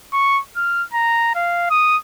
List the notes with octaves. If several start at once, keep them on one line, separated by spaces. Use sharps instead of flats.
C#6
F6
A#5
F5
D#6